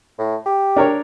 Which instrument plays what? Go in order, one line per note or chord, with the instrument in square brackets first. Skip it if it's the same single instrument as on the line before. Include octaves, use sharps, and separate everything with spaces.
[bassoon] A2
G4
[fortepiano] D4 A#4 C#5